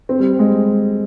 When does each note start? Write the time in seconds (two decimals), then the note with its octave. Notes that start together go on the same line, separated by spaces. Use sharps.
0.09 C4
0.20 G3
0.39 G#3